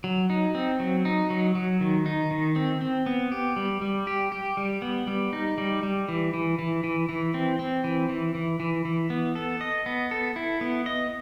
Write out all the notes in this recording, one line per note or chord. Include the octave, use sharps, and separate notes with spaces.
F#3
D#4
C4
F#3
D#4
F#3
F#3
D#3
D#4
D#3
C4
C4
B3
G4
G3
G3
G4
G4
G3
B3
G3
D#4
G3
G3
E3
E3
E3
E3
E3
C4
C4
E3
E3
E3
E3
E3
B3
A4
D#5
B3
A4
E4
B3
D#5